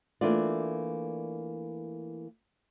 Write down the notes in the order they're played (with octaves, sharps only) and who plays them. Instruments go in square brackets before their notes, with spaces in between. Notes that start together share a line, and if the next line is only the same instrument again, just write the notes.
[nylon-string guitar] E3 A3 A#3 D4 F4 D5